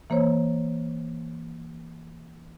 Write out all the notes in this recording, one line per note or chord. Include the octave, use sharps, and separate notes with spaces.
E3 A#3 C5 C#5